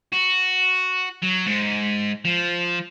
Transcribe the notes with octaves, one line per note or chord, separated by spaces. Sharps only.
F#4
F#3
G#2
F3